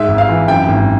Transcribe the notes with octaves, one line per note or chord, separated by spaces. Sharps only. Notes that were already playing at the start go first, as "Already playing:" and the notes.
Already playing: G#2 E5
G#1
F5
E3
F#2 G5
G#1 G5